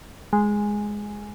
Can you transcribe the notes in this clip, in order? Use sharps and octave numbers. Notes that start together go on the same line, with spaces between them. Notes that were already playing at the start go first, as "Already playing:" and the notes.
G#3